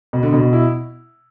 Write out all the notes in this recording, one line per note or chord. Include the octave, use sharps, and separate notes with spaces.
B2
D3
B2
E4